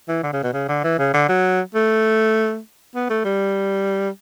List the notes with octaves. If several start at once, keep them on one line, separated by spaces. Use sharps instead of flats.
E3
D3
C#3
B2
C#3
D3
E3
C#3
D3
F#3
A3
B3
A3
G3